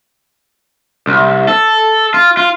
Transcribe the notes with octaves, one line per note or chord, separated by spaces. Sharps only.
C2
A4
F4
F4